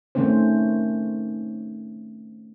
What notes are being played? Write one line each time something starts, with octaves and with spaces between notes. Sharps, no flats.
D#3 A3 C4 C#4 C5